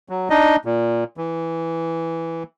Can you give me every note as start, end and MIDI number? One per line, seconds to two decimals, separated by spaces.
0.09 0.29 54
0.30 0.56 62
0.30 0.56 63
0.30 0.56 75
0.65 1.04 46
1.17 2.43 52